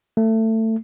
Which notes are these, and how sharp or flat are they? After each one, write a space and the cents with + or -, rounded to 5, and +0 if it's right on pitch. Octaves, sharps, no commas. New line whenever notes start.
A3 +20